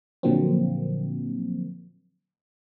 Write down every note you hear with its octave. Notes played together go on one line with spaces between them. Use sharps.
A#2 D3 F3 F#3 A#3 C4